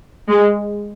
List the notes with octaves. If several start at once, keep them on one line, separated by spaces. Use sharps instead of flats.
G#3